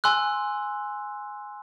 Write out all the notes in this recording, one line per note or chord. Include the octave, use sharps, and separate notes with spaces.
G#5 C6 E6 F#6